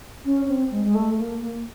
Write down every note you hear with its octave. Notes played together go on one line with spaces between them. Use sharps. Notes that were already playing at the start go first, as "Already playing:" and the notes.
C#4
C4
G#3
G#3
A3
A#3
A#3